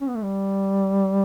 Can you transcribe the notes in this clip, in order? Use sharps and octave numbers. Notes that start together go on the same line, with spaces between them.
C#4
B3
A3
G3